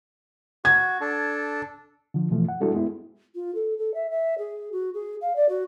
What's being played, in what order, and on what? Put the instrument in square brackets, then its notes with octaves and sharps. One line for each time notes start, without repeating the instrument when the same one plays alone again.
[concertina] F#4 [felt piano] G#6
[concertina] D4 A4
[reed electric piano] D3 F3
B2 E3 F3 A3
F#5
G3 G#3 D4 E4 F#4 A4
G#3 B3 E4
[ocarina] F4
A4
A4
E5
E5
G#4
F#4
G#4
F5
D5
F#4